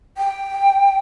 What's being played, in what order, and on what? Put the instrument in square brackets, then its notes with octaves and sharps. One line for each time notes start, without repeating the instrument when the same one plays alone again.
[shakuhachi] G5